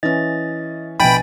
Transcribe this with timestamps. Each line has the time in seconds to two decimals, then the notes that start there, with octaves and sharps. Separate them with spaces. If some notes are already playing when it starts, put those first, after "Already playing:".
0.03 E3 C#4 D#5 A6
1.00 A#1 B2 G5 G#5 B5 A6